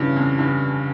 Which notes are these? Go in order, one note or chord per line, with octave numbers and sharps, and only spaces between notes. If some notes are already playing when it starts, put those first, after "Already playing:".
Already playing: G2 C#3 E3
F2
G2